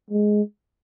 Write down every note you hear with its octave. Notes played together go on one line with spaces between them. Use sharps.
G#3